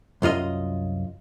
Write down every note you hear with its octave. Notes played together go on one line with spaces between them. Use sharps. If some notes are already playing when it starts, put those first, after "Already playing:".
C2 F#2 F4 D#5